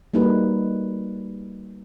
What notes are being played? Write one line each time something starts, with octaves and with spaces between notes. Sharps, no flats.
G3 A3 A#3 D#4 F#4 B4